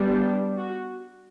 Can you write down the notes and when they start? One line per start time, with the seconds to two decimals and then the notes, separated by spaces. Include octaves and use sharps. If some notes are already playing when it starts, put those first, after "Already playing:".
Already playing: G3 B3 D4
0.09 G4
0.58 F#4